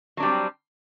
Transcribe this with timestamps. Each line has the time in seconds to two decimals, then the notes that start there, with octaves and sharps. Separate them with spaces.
0.17 F#3
0.20 D4
0.23 G3
0.25 C4